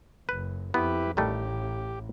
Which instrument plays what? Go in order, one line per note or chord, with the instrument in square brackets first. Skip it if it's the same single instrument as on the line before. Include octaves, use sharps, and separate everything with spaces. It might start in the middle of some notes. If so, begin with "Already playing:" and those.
[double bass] F#1 [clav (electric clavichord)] B4
[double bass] F2 [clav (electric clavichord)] B3 [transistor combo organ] E4 G4 B4
[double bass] A1 [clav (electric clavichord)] D#3 G3 A3 [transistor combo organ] G4